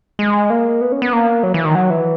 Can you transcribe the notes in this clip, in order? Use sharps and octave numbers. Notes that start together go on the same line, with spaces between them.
G#3
A#3
B3
C#4
B3
A#3
F#3
E3
D#3
F#3
E3